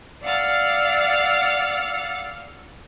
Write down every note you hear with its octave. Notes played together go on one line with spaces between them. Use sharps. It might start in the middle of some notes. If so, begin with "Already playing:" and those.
D5 F5 F#5 E6 F6 A6